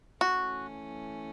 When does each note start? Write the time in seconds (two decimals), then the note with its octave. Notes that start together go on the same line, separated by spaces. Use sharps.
0.21 E3 A3 C#4 F#4